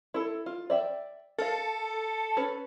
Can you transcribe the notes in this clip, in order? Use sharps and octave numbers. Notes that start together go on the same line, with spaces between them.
E4 A4
F4
D5 E5 G5
A4 A#4 F5
C#4 B4